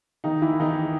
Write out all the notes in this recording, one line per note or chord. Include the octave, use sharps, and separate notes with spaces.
D#3 D#4
E3 E4
D#3 D#4